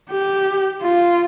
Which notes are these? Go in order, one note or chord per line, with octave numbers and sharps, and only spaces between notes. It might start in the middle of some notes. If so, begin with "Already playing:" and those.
G4
F4